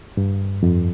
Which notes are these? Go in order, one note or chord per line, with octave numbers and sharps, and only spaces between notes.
G2
F2